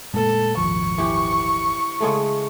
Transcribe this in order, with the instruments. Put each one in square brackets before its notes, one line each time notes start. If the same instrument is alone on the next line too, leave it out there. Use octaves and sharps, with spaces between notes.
[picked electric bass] A#2 G#3 A3 [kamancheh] A4
[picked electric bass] D#1 G#1 F3 [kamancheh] C#6
[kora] E3 G4
C#3 G#3 A3